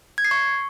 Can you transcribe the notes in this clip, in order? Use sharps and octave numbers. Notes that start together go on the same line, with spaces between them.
G#6
C7
C#6